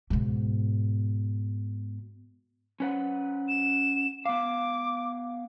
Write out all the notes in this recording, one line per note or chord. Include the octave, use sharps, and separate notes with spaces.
G#2 B2
C#4 B4 F#5
E7
B3 F5 D6